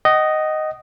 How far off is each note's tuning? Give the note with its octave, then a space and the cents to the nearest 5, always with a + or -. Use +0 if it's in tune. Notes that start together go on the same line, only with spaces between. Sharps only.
D#5 +0 F#5 +40